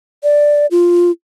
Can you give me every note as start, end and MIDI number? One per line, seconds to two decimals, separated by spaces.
0.23 0.66 74
0.71 1.11 65